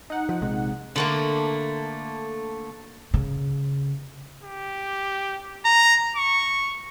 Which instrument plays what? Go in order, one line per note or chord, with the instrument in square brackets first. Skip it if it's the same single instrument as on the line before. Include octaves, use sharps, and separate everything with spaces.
[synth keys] D#4 F#5
[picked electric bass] F3
A#1 C3 G#3
[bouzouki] D3 A3 A#3
[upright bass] C#3
[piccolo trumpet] G4
A#5
C#6